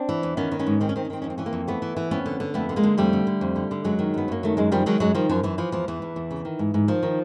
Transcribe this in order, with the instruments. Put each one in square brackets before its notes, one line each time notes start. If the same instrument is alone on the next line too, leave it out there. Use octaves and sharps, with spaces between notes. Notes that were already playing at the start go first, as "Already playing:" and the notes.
Already playing: [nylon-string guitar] C4 D4
E3
E2
D#3 B3 C#4
D#3
B3 C#4
G#2
D#3 C4
C#4
D#3 C4
C#4
D#3 C4
F2 C#4
C4
E3 C#4
A#3 C4
F2
E3 A3 B3
E3
E3
F2 B3 C#4
D3
D3
F2 A3 B3
D3
G#3 A#3
D3
F2 G3 A3
D3
D3
F2
D3
D3
F#2 F#3 G#3
D#3
F#2 B3
F#2 A#3
D#3 A3
F#2 G#3
D#3 F3 G3
D#3 F#3 G#3
F#2 F#3 G#3
D#3 F3 G3
F#2 F3
F#2 E3
E3 F3
E2 F3
E2 E3
E2
E2
C#3
D#3
G#2
G#2
D#3 F3
D#3